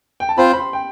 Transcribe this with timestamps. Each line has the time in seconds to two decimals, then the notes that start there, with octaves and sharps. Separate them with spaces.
0.20 G5
0.29 A5
0.38 C4 F4 C5 B5
0.53 B5
0.58 C6
0.73 G5